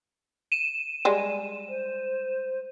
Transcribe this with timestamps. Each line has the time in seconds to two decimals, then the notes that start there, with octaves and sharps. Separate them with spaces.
0.52 D#7 E7
1.05 G3 G#3
1.69 C5